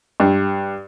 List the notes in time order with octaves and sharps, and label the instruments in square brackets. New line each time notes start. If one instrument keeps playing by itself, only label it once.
[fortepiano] G2